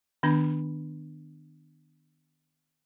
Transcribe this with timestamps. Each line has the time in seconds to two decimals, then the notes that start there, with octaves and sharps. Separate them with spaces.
0.23 D#3 B3 D4 B5